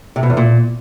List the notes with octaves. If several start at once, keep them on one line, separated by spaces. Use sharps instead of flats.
C3
B2
E2
A#2